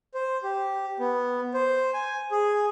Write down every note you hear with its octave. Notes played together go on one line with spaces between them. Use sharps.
C5
G4
B3
C5
G#5
G#4